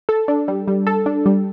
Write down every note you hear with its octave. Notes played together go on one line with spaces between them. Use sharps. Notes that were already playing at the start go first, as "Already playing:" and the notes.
A4
D4
G3
G3
A4
D4
G3